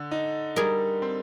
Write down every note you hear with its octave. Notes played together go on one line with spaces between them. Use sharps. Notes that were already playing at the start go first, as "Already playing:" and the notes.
Already playing: D3
D#4
G3 G#4 A#4
C4